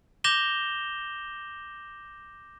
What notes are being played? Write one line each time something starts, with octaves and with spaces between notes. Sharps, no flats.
D6 G6 A#6 E7 F7 G7